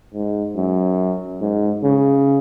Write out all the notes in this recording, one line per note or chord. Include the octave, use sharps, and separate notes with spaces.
G#2
F#2
G#2
C#3